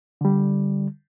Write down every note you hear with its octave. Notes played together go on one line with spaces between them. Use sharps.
D3 G3